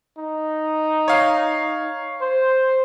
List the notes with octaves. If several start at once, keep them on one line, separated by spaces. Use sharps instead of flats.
D#4
C#5 F5
C5